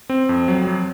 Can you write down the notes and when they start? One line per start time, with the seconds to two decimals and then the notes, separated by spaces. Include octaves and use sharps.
0.09 C4
0.29 F2
0.48 F#3
0.67 F#3